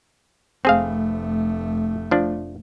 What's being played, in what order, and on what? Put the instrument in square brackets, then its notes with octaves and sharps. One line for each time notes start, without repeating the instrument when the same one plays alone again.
[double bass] F1 A3 [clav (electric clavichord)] C4 G#4 F5
[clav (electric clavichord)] F3 D4